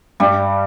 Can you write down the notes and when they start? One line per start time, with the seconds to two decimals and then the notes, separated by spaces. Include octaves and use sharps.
0.20 G2 G3